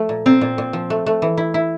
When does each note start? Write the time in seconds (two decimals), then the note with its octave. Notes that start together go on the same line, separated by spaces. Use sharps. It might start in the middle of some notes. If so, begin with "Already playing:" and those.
Already playing: F3 A3
0.09 A#2
0.26 A#2 C4
0.41 A#2
0.58 A#2
0.73 F3
0.90 A3
1.06 A3
1.22 E3
1.37 E4
1.54 E4